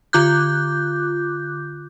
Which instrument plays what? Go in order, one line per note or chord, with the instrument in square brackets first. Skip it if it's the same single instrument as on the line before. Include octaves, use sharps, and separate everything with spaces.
[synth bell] D3 F4 D6 F#6 G6